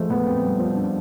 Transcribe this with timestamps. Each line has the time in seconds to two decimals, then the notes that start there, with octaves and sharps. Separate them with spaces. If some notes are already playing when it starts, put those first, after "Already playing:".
Already playing: F3 G#3 A3
0.10 A#2 B3
0.27 C4
0.43 G3
0.60 F3
0.77 D4